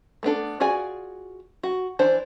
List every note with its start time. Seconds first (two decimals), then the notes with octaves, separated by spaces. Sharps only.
0.23 A3 B3 D4 A4
0.60 F4 F#4 G#4 D5 G#5
1.63 F#4
1.99 E3 D4 C5